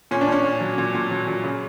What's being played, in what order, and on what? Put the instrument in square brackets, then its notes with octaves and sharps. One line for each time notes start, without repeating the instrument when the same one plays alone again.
[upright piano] A#2 C#4
D4
A#2 C#4
A#2
F#3
A#2
A#2
F#3
A#2
C#3